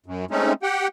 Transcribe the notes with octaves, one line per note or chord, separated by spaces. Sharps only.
F#2
G#3 A3 C4 C#4 D#4
G4 F#5 G5